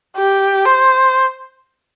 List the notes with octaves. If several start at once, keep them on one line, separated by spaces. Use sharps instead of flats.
G4
C5